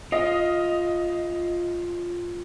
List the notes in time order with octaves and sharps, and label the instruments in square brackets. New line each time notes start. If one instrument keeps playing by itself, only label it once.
[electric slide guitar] F4 [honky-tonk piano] D#5